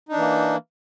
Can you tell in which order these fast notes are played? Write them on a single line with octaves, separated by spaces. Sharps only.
D#4 D4 E3 A#3